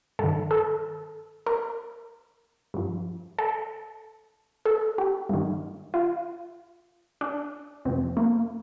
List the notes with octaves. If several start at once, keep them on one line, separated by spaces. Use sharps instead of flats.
G2 D#3 A4
A4
A#4
G2 F3
A4
A4
G4
G2 D#3
F4
D4
F2 C3 F3 C4
A#3